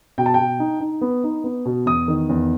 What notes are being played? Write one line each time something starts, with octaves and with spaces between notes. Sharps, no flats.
B2 G5
A5
B2 G5
D#4
D#4
B3
D#4
B3
B2
E2 D#6
D#3
E2